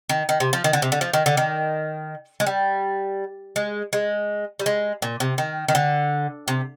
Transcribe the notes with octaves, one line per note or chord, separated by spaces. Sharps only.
D#3
D#3
C3
F3
D#3
D3
C3
D3
F3
D#3
D3
D#3
G#3
G3
G#3
G#3
G3
G#3
A#2
C3
D#3
D#3
D3
C3